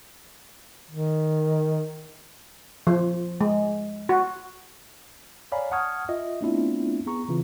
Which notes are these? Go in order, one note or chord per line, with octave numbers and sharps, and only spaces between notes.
D#3
F3
G#3
F#4
C#5 D5 F5 G#5 A#5 B5
F#5 A5 C#6 D#6 F6 G#6
F4 D#5 E5
A3 B3 C4 D4 E4 F4
B3 G#4 A#5 C#6
C#3 E3 C4 F4